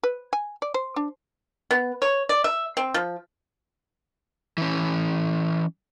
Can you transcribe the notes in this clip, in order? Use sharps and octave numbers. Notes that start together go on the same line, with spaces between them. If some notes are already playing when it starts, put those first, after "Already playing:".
B4
G#5
D5
C5
D4
B3
C#5
D5
E5
C4
F3
E3 C#4